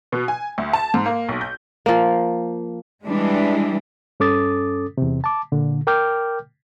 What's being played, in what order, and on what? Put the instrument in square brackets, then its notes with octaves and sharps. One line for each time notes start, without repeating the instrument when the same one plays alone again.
[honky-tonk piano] B2
G#5
D2
A5
G#2
A#3
B1
G6
[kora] F3 A#3
[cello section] E3 G3 G#3 D4
[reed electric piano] G2 C#4 A4 D6 D#6 A6
E2 C3
A5 D6
A#2 D3
A#4 G5 D6 F6 G6